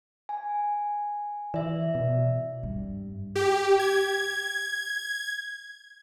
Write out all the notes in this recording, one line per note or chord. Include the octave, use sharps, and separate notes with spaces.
G#5
E3 D5 E5
B2
G2
G4
G#6